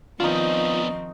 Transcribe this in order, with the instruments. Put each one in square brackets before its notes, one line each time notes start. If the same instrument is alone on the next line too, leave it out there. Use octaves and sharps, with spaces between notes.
[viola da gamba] D#3 F3 C4 [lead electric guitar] B3 D4 [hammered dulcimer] D#4 C#6 [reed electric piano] F4